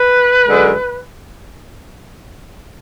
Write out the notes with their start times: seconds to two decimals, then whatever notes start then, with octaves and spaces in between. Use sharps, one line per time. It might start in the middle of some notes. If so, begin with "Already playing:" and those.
Already playing: B4
0.48 F#2 D3 G#3